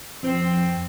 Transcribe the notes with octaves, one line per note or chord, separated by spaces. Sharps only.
F2 C4